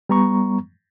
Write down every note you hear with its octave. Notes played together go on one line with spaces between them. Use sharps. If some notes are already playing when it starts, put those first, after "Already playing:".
G3 B3 A#5 C#6